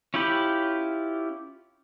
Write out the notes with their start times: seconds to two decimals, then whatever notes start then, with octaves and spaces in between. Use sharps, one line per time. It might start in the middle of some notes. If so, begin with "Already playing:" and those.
0.14 C#4 E4 F4 G4 B5